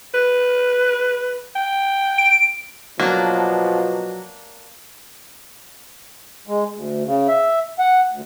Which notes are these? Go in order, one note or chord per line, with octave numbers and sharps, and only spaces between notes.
B4
G5
D7
B2 F3 F#3 A#3 D4
G#3
D2
C#3
E5
F#5
D2